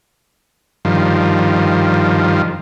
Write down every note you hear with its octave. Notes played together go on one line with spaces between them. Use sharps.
G2 D#3 F3